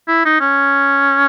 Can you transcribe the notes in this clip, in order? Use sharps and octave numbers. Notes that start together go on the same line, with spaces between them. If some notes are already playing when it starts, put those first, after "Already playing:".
E4
D#4
C#4